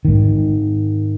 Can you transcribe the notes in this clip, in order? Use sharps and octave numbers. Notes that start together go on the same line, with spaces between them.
G#2 D#3